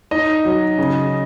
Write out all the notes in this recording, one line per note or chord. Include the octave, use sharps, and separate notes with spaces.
D#4 D#5
F#3
C#3